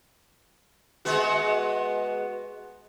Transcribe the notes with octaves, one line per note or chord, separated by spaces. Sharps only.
G#3 B3 F#4